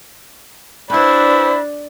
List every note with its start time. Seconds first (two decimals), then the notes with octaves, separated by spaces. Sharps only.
0.90 G2 D4 E4 B4 C5 B5